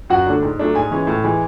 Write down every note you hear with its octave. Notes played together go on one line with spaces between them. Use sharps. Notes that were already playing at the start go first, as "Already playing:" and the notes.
F#2 F#4 F#5
D3 A3 D4
G#2
F#3 A3 D4
G#2 G#4 G#5
E3 G#3 C#4
A2
E3 G#3